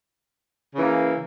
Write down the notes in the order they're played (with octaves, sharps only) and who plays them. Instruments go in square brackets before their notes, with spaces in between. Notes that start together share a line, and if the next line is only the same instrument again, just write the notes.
[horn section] C#3 E3 A#3